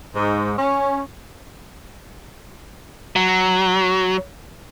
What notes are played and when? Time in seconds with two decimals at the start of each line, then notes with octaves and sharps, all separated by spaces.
0.15 G#2
0.58 C#4
3.16 F#3